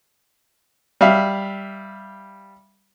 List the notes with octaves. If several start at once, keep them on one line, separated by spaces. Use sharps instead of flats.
G3 E5 F5